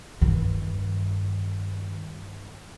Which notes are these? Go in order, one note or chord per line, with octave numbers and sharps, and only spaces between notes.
G2 D#3